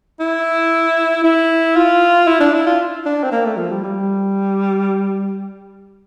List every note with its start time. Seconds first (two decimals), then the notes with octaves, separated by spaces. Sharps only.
0.20 E4
1.24 E4
1.76 F4
2.27 E4
2.40 D4
2.54 E4
2.67 F4
3.06 D4
3.24 C4
3.32 A#3
3.45 A3
3.57 F3
3.71 G3
3.84 G3